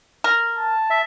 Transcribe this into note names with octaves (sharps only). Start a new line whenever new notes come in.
A#4
A5
E5